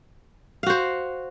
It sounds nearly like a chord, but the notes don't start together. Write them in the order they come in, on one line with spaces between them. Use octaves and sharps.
F5 F#4 C5